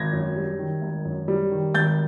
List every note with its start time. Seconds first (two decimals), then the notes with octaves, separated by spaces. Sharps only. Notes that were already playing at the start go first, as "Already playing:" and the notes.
Already playing: G#1 G#6 A#6
0.13 F#2
0.36 G3
0.59 D#3
0.82 G#1
1.05 F#2
1.28 G3
1.51 D#3
1.74 G#1 G6 A6